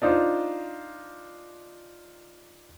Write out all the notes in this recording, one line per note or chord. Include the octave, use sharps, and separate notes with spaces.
D4 D#4 F4 C5